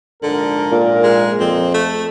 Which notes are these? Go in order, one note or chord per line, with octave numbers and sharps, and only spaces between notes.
A#1 G#2 D3 A#4
A#2
G#3
F2 C4
A3